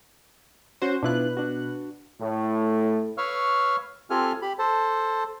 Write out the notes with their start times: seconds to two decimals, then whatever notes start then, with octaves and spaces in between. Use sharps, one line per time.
0.82 C#4 F#4 C5
1.03 B2 D4 E4 F4 B4 F#6
1.37 D4 F#4
2.21 A2
3.18 B4 C#5 F5 C#6 E6 F6
4.10 C4 F4 G4 A4 G#5 F6
4.42 G4 B5
4.59 A4 C5 A5